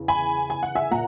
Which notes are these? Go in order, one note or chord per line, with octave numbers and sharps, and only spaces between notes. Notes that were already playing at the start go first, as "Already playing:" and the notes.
Already playing: E2 C#3
G#5 B5
G#5
F#5
E5 G#5
A#2 F#5 A#5